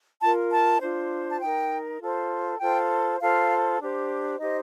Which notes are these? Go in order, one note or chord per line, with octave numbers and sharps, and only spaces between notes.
F4 A#4 A5
A5
D4 F4 C5
A5
D#4 A#4 G5
F4 A4 C5
F4 A4 C5 G5
F4 A4 C5 F5
D4 G4 C5
D#4 G4 C5 D#5